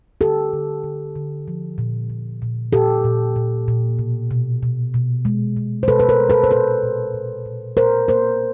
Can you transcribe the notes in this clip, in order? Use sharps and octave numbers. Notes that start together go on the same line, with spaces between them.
D3 G4 A4
D3
D3
D3
F3
A#2
A#2
A#2
A#2 G4 A4
A#2
A#2
A#2
B2
B2
B2
B2
G#3
B2
C5
B2 A4 B4
B4
A#4 C5
G#3
A4 B4
C5
A#2 A4 B4
A#2
A#2
A#2
A#2 A#4 C5
A#3 A#4 C5